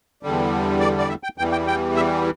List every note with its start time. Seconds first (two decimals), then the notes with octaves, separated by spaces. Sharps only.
0.23 E2 D3 G3
0.80 D5
0.98 D5
1.09 E5
1.23 G5
1.38 E2 E3 G3 G5
1.52 G5
1.67 G5
1.96 E5